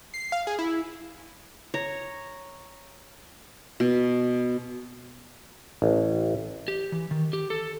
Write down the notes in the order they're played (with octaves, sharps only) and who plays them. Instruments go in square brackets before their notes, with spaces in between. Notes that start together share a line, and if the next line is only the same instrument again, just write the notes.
[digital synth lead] C7
F5
G#4
E4
[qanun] C#5 A#5
B2
[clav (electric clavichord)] A1
[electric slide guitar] G4
E3
D#3
G4
A4